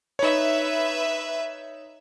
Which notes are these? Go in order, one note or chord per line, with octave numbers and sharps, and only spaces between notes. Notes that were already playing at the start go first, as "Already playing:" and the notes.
D#4 B4 C#5 E5